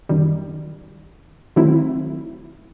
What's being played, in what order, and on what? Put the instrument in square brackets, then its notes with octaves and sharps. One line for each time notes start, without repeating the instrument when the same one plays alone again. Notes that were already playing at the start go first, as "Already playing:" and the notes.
[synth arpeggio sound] F#2 D#3 G3
D#3 F#3 A3 C4 E4